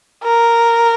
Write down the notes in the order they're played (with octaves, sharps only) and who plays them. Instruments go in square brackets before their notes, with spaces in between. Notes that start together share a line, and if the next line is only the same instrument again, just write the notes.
[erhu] A#4